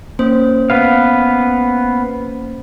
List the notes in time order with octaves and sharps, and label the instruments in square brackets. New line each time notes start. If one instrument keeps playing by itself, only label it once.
[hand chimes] A#3 C#4 C5
[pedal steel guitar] B3 B4 F5